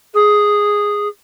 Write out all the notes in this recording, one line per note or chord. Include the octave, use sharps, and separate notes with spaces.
G#4